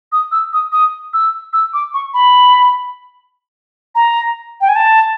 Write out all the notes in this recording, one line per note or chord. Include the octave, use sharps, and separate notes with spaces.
D#6
E6
D#6
D#6
E6
E6
D6
C#6
B5
A#5
G5
G#5
A5